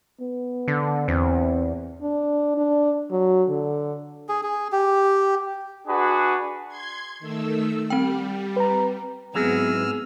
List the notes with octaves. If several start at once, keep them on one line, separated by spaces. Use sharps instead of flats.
B3
D3
E2 C4
D4
D4
F#3
D3
G#4
G#4
G4
D4 F#4 G#4 B4
C6 G#6
D#3 A3 E6
G3 C4 G5
B4 A#5
G#2 F#3 B3 C4 E4 G#4 E6 F6